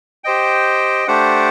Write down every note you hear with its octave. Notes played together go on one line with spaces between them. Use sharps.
G4 C5 D#5 G5
A3 D4 G4 C5 F#5